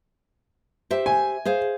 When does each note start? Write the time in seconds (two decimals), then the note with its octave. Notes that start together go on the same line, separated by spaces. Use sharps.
0.91 G4 C5 E5
1.06 G#5
1.45 G#4 C5 F5